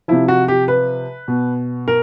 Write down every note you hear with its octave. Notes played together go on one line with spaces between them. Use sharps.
C3 F3 E4
F#4
G4
B4
B2
A#4